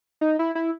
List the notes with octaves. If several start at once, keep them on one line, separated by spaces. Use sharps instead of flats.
D#4
E4
E4